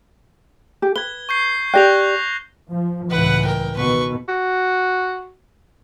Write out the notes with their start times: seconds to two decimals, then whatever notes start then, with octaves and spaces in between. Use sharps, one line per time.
0.82 G4
0.96 B4 G#6 G7
1.29 C#6 G6 C7
1.74 G4 D5 G5 F#6 A#6 F7
2.71 F3
3.10 C#2 A2 E3 B4 F#5
3.45 A#4 G5
3.76 B2 D#3 B4 C#6
4.29 F#4